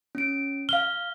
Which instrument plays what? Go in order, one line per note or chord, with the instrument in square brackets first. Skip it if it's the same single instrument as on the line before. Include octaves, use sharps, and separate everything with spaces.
[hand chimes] C#4 D7
[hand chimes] F5 F6 [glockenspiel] G7